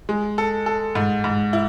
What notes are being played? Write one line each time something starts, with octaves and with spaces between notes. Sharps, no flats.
G#3
A4
A4
G#2
G#2
E4